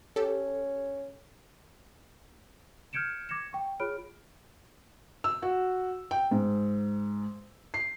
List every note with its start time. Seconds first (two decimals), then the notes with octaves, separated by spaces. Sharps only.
0.16 C#4 G4 A4
2.93 F6 G6 G#6 C#7 D7 E7
3.29 D6 G#6 A#6 C#7 E7
3.53 G5 C#6
3.80 F4 G#4 C#5 B5 F6 D7
5.24 E6
5.42 F#4
6.11 G5
6.31 G#2
7.74 C7